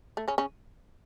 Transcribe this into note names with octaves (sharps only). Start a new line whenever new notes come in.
A3
C#3 C#4
C#3 C#4